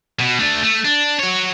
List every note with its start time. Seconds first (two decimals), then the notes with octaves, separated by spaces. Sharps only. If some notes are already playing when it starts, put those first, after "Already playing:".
0.19 B2
0.39 A3 D4
0.64 A3
0.85 D4
1.19 F#4 C#5